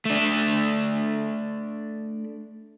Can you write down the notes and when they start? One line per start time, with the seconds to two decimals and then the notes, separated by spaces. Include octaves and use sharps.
0.05 A3 D4